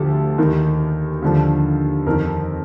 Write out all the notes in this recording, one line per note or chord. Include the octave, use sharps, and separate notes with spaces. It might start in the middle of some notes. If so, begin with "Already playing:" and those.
Already playing: D2 D3 F3 G4 A4
D#2 D#3
D#2 D3 F3
F2 D#3 A#4